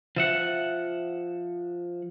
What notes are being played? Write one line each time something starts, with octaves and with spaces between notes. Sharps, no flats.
F3 E5 F#5